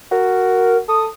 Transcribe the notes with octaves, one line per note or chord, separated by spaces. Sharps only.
F#4 A#4
A4 D#6